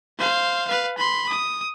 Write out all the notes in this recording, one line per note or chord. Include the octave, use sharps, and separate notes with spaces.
C5 F5
B4 F5
B5 C6
D#6